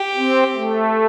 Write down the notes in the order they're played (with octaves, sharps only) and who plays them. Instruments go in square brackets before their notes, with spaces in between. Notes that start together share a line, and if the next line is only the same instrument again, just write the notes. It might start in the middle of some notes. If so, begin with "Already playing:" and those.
Already playing: [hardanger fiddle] G4
[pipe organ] C4
A3